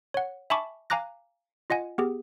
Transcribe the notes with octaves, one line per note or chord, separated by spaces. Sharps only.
C#5 F#5
E5 G#5 A5 B5 C#6 D6
F5 G#5 A#5 D6 F#6 A#6
F4 D#5 F#5 G#5
B3 G4 G#4